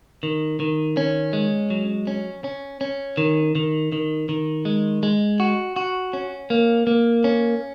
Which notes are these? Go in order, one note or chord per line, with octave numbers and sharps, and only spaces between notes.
D#3
D#3
C#4
G#3
F#3
C#4
C#4
C#4
D#3
D#3
D#3
D#3
G#3
G#3
F#4
F#4
C#4
A#3
A#3
C#4